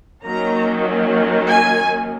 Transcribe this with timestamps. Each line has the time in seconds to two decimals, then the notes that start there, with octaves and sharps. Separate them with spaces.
0.25 D#3 F#3 A#3 C#4 A#5
1.48 G#5